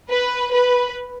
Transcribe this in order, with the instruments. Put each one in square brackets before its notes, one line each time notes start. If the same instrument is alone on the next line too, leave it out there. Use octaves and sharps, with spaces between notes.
[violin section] B4
B4